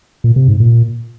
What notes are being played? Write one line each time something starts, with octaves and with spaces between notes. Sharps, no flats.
A#2
C3
G#2
A#2